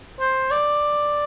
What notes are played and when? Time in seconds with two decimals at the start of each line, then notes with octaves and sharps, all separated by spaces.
0.20 C5
0.51 D5